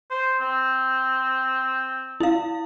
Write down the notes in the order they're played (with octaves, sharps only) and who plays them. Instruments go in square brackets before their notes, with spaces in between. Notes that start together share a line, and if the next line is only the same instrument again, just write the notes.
[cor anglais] C5
C4
[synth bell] E4 F5